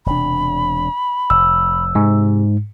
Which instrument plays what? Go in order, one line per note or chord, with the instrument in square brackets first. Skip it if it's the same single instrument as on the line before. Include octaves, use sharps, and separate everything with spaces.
[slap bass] E1 C3 D4 [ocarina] B5
[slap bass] F1 [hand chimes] E6
[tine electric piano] G#2 [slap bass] C3